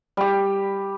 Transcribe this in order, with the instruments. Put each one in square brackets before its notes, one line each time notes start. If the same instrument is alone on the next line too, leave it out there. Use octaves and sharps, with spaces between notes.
[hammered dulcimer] G3 G4